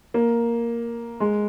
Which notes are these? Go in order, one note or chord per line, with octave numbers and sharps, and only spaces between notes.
A#3
G#3